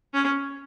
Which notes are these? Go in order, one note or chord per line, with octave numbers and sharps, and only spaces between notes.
C#4